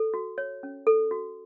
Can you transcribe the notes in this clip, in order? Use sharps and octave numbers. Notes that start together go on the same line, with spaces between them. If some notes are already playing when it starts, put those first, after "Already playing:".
Already playing: A4
F#4
C#5
C#4
A4
F#4